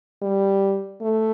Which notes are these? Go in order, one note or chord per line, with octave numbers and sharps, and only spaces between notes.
G3
A3